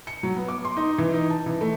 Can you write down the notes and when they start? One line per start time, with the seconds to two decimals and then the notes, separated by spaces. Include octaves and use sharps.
0.07 C#7
0.23 F#3
0.37 B3
0.48 D6
0.65 C6
0.77 D#4
0.98 E3
1.13 D#4
1.30 A5
1.46 E3
1.61 A3